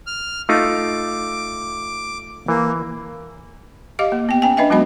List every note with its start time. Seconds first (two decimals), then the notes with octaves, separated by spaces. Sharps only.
0.07 F6
0.49 A3 D#4 F4 D6
2.48 E3 A#3
3.99 G4 D#5 F5 D6
4.12 A#3
4.29 B3 G5
4.42 C#4 G5 G#5
4.57 D4 B4 D#5 E5 G#5
4.70 F#3 G#3 B3 F#4 D#5 B5